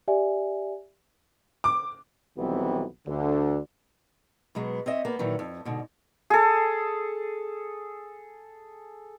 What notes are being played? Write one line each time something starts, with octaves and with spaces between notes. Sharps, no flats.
G4 D5 E5 G#5
D6
B1 D#3 E3 G3 B3 C4
D2 D3
B2 F#3 G#3 B3
C4 C#5 D#5 E5
A#3 B3
A#2 D#3 E3 F#3
F2
G#2 B2 D3
G#4 A4